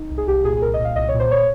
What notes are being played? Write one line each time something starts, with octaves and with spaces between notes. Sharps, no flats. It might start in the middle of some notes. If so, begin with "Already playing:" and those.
Already playing: D#4
C2
G#4
C2 G4
A#2 G#4
G#4
C2 A#4
D#5
A#2
F5
C2 D#5
C#5
A#2
C5
C#5